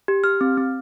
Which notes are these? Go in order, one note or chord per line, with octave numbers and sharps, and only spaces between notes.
G4
G4 F6
C4
C4